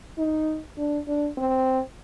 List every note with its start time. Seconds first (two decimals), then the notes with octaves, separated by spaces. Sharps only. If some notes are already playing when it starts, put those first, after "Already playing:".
0.18 D#4
0.78 D4
1.07 D4
1.38 C4